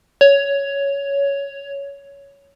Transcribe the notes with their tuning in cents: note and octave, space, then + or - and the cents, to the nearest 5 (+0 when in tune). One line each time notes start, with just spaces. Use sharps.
C#5 +10